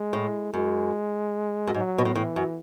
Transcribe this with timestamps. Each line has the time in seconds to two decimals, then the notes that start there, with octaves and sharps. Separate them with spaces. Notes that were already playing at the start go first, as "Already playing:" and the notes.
Already playing: G#3
0.13 A2
0.53 F#2 G#3
1.67 F#2
1.74 G#2 F#3
1.98 B2
2.05 A2
2.15 A2 E3
2.36 F#2